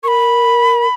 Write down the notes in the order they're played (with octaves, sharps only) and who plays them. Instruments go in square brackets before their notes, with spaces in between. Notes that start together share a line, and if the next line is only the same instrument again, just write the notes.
[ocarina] A#4 [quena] B5 C#6